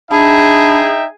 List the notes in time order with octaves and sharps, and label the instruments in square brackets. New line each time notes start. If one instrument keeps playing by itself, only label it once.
[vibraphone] D4 A5 B5 [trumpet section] D#4 E5 G5 [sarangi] G#4